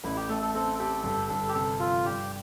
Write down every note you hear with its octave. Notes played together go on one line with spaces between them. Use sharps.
A1 E4
G4
A3 A4
A4
C4 A4
G4 A4
G1 A4
G1 A4
G4
C3 A4
F3 F4
G2 G4